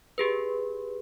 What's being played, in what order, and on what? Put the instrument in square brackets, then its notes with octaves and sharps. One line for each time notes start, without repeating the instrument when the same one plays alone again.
[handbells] G4 G#4 B4